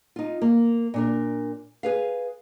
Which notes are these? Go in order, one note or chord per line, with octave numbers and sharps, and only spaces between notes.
D#4 F4
A#3
A#2 D4 A#4
G#4 B4 F5